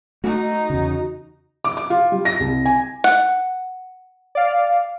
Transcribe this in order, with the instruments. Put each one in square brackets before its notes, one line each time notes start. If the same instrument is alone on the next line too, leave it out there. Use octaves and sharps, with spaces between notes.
[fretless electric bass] A3 [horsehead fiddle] D#4 [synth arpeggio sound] F#4
[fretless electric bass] E2 C#3
[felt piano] D6
D6
F4
G3
A#6
C2
G#5
[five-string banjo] F#5
[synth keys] D5 F5